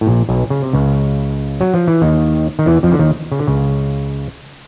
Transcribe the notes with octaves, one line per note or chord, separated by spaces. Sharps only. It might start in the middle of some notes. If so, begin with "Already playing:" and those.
A2
A#1 A#2
B1 B2
C#3
C3
C#2 C#3
F#3
F3
E3
D#2 D#3
D#3
E2 E3
F2 F3
D3
D#2 D#3
C#3
D3
C#2 C#3